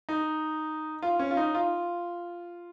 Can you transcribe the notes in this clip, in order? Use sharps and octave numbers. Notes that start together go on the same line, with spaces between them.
D#4
F4
C#4
F4
D#4
F4